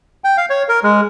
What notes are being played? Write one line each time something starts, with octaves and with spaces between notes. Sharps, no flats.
G5
F5
C#5
A#4
G#3